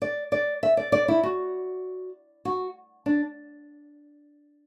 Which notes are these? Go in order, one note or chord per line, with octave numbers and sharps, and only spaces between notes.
D5
D5
E5
D5
D5
E4
F#4
F#4
D4